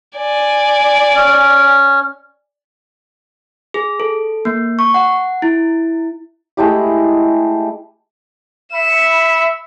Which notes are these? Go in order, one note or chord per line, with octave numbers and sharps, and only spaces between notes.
D5 G#5
C#4
G#4
A4
A#3
C#6
F#5
E4
G#3 A3 E4 G4
E5 B5 C#7 E7